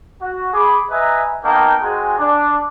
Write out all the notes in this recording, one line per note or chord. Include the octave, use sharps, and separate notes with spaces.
F#4
G#4 B5 D6
B4 D#5 E5 G#5 A#5
A#3 B3 D#4 A#4 G5 A5
G#3 C4 F#4 G#4 G#5
D4